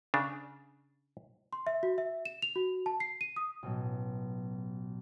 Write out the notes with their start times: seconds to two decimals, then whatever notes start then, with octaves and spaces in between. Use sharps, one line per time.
0.14 C#3 D4
1.53 C6
1.67 E5
1.83 F#4
1.98 E5
2.25 E7
2.42 F7
2.56 F#4
2.86 A5
3.00 C7
3.21 D#7
3.36 D#6
3.63 A1 B2 F#3